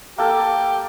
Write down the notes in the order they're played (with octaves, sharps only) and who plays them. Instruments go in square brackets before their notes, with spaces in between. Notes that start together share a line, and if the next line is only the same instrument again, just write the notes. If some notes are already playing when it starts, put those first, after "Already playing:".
[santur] A#3 A4 [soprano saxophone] G4